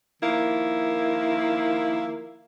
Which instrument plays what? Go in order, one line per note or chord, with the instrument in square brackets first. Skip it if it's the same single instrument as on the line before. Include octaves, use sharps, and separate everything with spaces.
[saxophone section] D#3 F3 A#3 E4